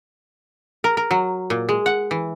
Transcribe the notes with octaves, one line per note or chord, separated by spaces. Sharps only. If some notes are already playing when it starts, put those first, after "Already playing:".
A#4
A#4
F#3
A#2
G#3
F#5
E3